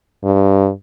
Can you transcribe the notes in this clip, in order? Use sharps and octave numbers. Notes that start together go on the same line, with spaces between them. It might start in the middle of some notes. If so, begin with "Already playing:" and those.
G2